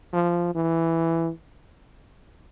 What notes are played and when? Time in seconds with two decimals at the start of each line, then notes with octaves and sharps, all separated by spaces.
0.13 F3
0.55 E3